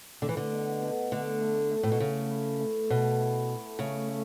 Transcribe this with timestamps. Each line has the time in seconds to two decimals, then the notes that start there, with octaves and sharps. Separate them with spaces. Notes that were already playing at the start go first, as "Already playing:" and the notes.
0.22 D3 A3
0.29 E3
0.37 D3
0.52 B2
0.82 B2
1.12 D3 A3
1.41 A3
1.71 A3
1.83 A2
1.92 B2
2.00 C#3 A3
2.30 E4
2.60 A3
2.90 B2 A4
3.19 E4
3.49 A4
3.79 C#3 A3
4.09 A3